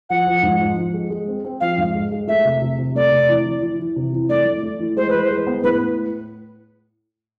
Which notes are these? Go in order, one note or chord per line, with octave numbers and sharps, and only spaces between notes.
F3 F#5
F3
G#2
F3
F3
G#3
G#3
C4
C4
F3 F5
G#2
G#3
G#3
A3 E5
C3
C3
C3
A3 D5
C3
E3
E3
E3
E3
C3
E3
A3 D5
A3
A3
E3
G#3 C5
E3 B4
C5
G#3
B3
A2 B4